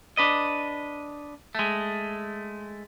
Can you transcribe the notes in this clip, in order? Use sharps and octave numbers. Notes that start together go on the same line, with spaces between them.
D4 B4 D#5
G#3 A3